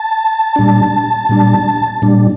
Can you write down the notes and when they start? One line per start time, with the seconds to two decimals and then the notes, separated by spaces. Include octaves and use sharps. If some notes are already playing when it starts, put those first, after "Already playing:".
Already playing: A5
0.56 A#2 G3 D4
1.29 A#2 G3 D4
2.02 A#2 G3 D4